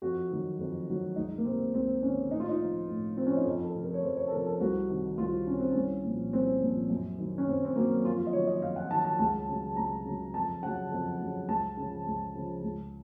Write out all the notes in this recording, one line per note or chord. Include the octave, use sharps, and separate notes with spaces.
F2 F#4
D#3 F#3
F2
D#3 F#3
C#2 D#4
A#3
C3 D#3 C4
C#2 C4
C3 D#3 C#4
A2 D#4
F4
D#4
F3
A2
F3 C4
C#4
D#4
F2 F4
A4
C3 F3
A#4
C#5
F2 C5
C#5
A4
C3 F3 A#4
A4
C2 F#4
C3 D#3
C2 F4
C3 D#3 C#4
C4
C2 C#4
A#2 F3
C2 C4
A#2 F3
F#2
D#3 F#3
C#4
F#2 C4
C4
D#3 F#3 A#3
F2 F4
F4
D#5
D#3 F#3 C#5
D#5
F2 F5
F#5
D#3 F#3 A5
A5
C#2 A5
C#3 F#3
C#2 A#5
C#3 F#3
F2 A5
C#3 F#3 F#5
F2
C#3 F#3
C#2 A5
C#3 F3
C#2
C#3 F3
C#2